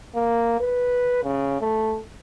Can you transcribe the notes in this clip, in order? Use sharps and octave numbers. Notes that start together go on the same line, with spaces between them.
A#3
B4
C#3
A3